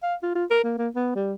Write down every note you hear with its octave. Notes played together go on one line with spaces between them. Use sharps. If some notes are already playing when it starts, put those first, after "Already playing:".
F5
F4
F4
A#4
A#3
A#3
B3
G3